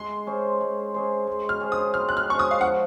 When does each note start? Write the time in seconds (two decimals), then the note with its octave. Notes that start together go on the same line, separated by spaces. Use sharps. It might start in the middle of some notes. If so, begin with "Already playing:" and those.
Already playing: G#3 C6
0.27 C#4 G#4 C5
0.61 G#3
0.94 C#4 G#4 C5
1.27 G#3
1.49 F6
1.61 C#4 G#4 C5
1.72 D#6
1.94 G#3 F6
2.09 F#6
2.17 F6
2.28 C#4 G#4 C5 C#6
2.39 D#6
2.51 F5
2.61 F3 F#5